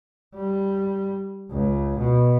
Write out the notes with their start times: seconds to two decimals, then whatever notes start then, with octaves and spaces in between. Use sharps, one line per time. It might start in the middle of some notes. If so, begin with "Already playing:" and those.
0.34 G3
1.50 C#2
1.99 B2